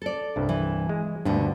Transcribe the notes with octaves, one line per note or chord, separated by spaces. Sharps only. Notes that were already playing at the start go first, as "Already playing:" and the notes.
A4 D5
C2 G2
E3
G#3
D2 G2 B2 D3